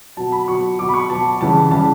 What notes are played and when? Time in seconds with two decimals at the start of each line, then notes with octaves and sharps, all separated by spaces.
0.17 B2 F#3 A5
0.32 B5
0.48 B2 F#3 C#6
0.79 B2 F#3 D6
0.89 B5
0.94 C#6
1.10 B2 F#3 A5
1.40 C#3 E3 G3 A5
1.71 C#3 E3 G3 A5